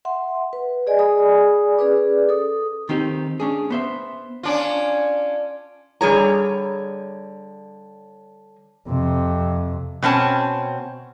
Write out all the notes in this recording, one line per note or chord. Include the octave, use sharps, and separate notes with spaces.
E5 F#5 C6
B4
G#4 D5 D#5 G#5
G#4 D5 G#5 B5 D#6
C#4 G#4 B4 D5 D6
A4 D#6
D#3 C4 D#4 G4
C#4 D4 G#4
B3 C5 E5
C#4 D4 F4
D3 G3 G#4 C#5 A#5
F2 C3
B2 C4 C#4 A5